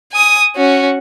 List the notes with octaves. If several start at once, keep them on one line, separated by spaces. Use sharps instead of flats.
G#5 D#6
C#4 F#4